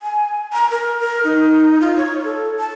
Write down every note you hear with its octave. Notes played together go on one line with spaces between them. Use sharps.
G#5
A#5
A#4
A#4
D#4
F4
C#5
A4
A5